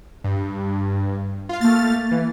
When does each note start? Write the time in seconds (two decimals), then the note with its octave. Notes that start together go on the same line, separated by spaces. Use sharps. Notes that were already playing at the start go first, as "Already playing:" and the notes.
0.24 G2
1.49 F4 F5
1.61 A3 A#3 F6 A6
2.11 E3